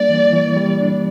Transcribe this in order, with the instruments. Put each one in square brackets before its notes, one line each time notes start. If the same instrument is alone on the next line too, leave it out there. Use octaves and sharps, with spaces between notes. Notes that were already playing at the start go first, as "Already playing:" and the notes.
Already playing: [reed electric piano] G3 A#3 D4 [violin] D5
[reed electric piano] E3
E3
G3
D4